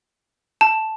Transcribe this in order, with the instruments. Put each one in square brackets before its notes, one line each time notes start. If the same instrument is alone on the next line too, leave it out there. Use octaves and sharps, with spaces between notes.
[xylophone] A5